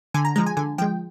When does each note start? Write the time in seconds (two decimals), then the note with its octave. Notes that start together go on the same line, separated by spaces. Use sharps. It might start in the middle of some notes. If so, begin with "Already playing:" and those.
0.14 D3 G#5
0.25 A#5
0.36 F3 G#3 A#5
0.46 G#5
0.57 D3 G#5
0.78 F3 G#3 G5